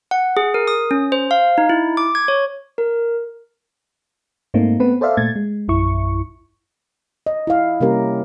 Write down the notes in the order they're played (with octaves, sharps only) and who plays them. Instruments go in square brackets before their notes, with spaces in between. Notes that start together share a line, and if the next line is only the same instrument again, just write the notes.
[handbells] F#5
G#4
A#4
D#6
C#4
C5
F5
D#4
E4
D6
G#6
C#5
A#4
[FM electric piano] G#2 A3 A#3 C4 D#4
A3 B3 C4 B4
A4 C5 D5 E5 F5
A#2 A3 G#6 A6
G#3
A#1 F#2 E4 C#6
[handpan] D#5
E4 F5
C3 G3 A#3 C#4 G4 A#4